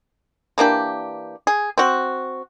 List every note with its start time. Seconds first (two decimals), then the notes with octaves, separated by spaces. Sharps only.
0.58 E3 A#3 D4 G4
1.47 G#4
1.78 C4 F#4